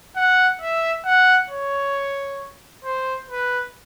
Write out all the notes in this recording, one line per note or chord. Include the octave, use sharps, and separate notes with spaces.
F#5
E5
F#5
C#5
C5
B4